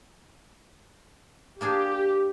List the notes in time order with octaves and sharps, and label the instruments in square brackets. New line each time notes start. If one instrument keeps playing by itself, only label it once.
[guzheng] A#3 D4 G#4 [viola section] G4